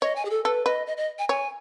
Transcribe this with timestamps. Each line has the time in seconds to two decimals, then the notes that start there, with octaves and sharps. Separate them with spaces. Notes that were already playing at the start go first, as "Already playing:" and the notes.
0.02 C#5 D#5
0.16 G#5
0.25 G#4
0.30 A4
0.44 A4 B4
0.66 B4 D#5
0.87 D#5
0.97 D#5
1.19 G#5
1.29 C#5 G#5